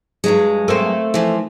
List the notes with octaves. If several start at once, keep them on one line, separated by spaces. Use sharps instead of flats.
G2 F#3 G#3
A3 A#3 C4
E3 F3